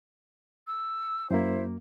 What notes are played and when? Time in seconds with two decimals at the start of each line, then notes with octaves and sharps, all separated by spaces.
0.68 E6
1.31 F#2 A#3 E4 C5